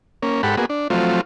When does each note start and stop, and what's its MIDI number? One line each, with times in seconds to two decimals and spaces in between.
0.23 0.42 58
0.23 0.42 61
0.43 0.56 44
0.43 0.56 67
0.43 0.56 69
0.43 0.56 78
0.43 0.56 83
0.57 0.66 58
0.57 0.66 59
0.57 0.66 66
0.57 0.66 68
0.70 0.88 62
0.90 1.21 53
0.90 1.21 54
0.90 1.21 57
0.90 1.21 60
0.90 1.21 65